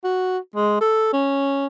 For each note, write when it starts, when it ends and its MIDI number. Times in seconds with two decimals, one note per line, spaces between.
0.03 0.38 66
0.55 0.78 56
0.81 1.12 69
1.13 1.66 61